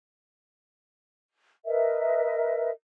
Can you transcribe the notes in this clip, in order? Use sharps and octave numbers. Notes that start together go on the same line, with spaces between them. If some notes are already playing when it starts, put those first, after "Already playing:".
A#4 B4 D#5 E5